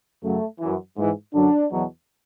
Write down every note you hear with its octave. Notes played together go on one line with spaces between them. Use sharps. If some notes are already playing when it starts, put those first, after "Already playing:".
F#2 C#3 F#3 A3
F#2 E3
G#2 E3 G#3
F#2 D3 F#3 D4
E2 B2 F#3